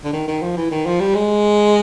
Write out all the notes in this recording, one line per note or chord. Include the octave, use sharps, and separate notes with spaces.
D3
D#3
D#3
F3
E3
D#3
F3
G3
G#3